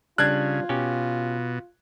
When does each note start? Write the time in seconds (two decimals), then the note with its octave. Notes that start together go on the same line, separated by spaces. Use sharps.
0.18 C#3 G3 D4 F4 F#6 G#6
0.69 B2 C#4 G4